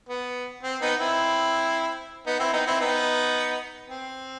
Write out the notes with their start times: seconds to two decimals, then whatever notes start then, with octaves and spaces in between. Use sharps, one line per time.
0.09 B3
0.63 C4
0.81 B3 D#4
1.00 C4 E4
2.26 B3 D#4
2.39 C4 E4
2.53 B3 D#4
2.67 C4 E4
2.80 B3 D#4
3.89 C4